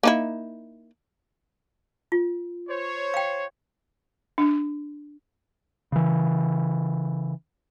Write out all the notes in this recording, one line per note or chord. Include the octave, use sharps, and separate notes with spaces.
A#3 D#4 E4
F4
C5 C#5
F5 G5
D4
C#3 E3